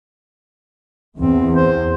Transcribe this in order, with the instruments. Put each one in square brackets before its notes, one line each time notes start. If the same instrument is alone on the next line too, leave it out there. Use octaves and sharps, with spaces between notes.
[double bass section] E2 [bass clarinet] C4
[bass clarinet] C5